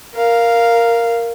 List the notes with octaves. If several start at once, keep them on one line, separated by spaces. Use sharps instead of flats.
A#4 F5